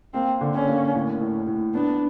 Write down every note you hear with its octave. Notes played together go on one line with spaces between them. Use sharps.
A#3 C4
D3
C#4
A#3
A2
A2
A2
B3 D4